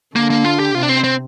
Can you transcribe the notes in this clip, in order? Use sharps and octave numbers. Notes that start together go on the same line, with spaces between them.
D3 A#3
A#3
F4
G4
C3 F4
D4
C4
C4